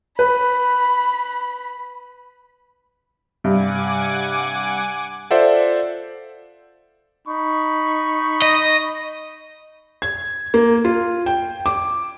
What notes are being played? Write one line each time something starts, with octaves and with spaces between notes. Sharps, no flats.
B4 B5
G2 C3 F#5 G#5 D6
F4 A4 C5 D5 E5 F#5
D#4 B5 C#6
D#5
G#6
A#3
F4
G5
D6